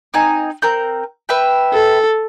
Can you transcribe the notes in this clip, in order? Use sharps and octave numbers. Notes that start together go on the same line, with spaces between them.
C4 D#4 G#5
C4 A#4 G6
B4 E5 G5
A4